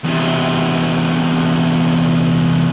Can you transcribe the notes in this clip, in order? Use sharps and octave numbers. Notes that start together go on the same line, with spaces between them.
E2 C3